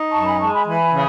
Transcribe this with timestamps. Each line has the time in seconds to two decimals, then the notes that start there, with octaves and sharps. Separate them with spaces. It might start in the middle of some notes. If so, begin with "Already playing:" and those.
Already playing: D#4
0.11 F#2 A5 C#6
0.26 G#5 B5
0.38 G#3 A5 C#6
0.53 G#5 B5
0.66 E3 G#5 B5
0.93 C#3